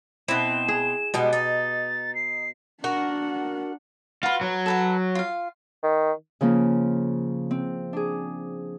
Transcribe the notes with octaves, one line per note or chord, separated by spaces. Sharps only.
B2 C4 E4 E7
G#4
B2 G3 G#3 B3
D#4 A6
C7
D4 F#4 A#4 F#5
F4 F#4 B4
F#3
A4 B4 F#5
F4 F5
D#3
C#3 F3 A#3 F4
C4
D4 G#4